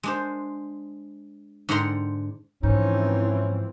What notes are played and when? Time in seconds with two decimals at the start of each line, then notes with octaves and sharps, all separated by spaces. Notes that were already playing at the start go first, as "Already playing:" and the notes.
0.03 G#3 D4 C5
1.69 G#2 D3 F#5 G5 A#5 C6
2.63 G#2 E3 F3 C4 C#4 D#4